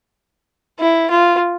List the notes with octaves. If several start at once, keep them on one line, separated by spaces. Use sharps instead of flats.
E4
F4